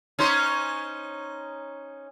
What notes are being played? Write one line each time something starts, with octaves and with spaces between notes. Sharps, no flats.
C#4 D#4 C5